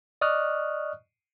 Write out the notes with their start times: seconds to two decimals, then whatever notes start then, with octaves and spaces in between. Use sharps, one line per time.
0.21 D5 D#5 C#6 D#6 F6 F#6